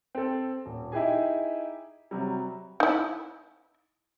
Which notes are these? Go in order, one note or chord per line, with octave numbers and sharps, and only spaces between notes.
C4 A4
D#1
D#4 E4 G4 G#4 G#5
C3 F#3 G3
D#4 E4